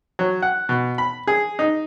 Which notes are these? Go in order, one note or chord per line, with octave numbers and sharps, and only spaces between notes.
F#3
F#5
B2
B5
G#4
D#4